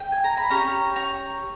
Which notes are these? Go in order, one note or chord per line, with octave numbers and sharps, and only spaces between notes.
G5
G#5
A#5
B5
C#4 G4 A#5 C#6
A#5 C#6